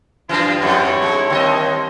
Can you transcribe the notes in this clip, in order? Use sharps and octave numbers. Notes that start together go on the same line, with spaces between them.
G2 E3 F3 D4 F4
F2 G#2 E3 C4 D#4 E4 C#5
G#3
D#2 C4 C5 D5 D#5 A5